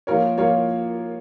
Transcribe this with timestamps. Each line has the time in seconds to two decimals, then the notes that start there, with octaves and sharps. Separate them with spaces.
0.07 F3 A#3 F4 A#4 C#5
0.38 F3 A#3 F4 A#4 C#5